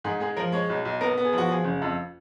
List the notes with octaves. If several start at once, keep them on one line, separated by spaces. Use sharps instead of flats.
G#2 G#4
G#3 G#4
F3 A#4
G#3 C#5
B1
B1
B3 A#4
B3
G#4
F3 F#4
F3 G#4
F#1
F2